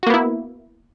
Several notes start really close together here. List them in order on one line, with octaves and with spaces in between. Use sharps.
F#4 A#3 B3 E4